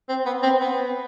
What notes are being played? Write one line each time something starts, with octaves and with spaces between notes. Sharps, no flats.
C4
B3
C4
B3